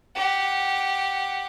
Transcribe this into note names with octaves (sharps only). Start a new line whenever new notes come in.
G4 F#5